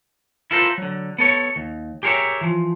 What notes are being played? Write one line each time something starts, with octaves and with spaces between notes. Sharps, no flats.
E4 F4 A4 A#4 C5
D3 F#3
B3 A4 C#5
D#2
G4 G#4 A#4 C5 C#5 E5
E3 F3